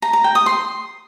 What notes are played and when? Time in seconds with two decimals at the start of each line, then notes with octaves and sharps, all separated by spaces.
0.02 A#5
0.13 A#5
0.24 G5
0.35 D#6
0.46 C6